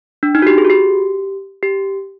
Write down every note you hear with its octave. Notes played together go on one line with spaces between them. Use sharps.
D4
D#4
F#4
G4
G#4
F#4
G4
G4